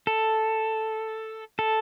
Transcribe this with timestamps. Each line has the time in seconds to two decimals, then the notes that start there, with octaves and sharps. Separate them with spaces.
0.07 A4
1.59 A4